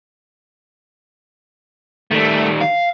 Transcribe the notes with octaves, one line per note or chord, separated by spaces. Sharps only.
D#3 G3 A3
F5